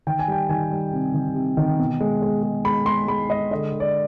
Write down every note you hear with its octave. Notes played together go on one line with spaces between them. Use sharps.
D#3 G5
G#5
G3 G5
D#3 G#5
G3
C3
D#3
C3
D#3
B2
G#3
G#3
G#3
G#3 B5
G#3 C6
G#3 B5
G#3 D#5
D3 D#5
D3
D5